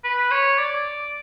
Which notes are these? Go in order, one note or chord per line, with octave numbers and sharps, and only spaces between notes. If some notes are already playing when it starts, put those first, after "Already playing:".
B4
C#5
D5